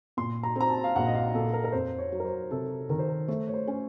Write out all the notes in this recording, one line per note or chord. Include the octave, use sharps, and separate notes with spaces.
A#2 C6
A#5
C4 A#5
A5
F5
A#1 F#5
D#5
F5
A#2 A4
A#4
A#4
F2 C5
C#5
F#3
A#4
C5
C3 A4
D#3 A#4
C5
A#4
A3 C5
C#5
C5
C#4